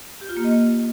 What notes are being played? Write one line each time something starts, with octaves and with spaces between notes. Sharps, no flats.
G4
F4
A#3
D#5